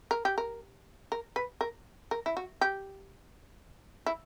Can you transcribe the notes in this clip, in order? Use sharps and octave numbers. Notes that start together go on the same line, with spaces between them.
A#4
G4
A#4
A#4
B4
A#4
A#4
E4
F#4
G4
E4